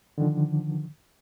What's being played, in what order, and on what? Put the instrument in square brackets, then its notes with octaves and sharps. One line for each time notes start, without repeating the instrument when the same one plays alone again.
[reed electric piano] D3 D#3 F3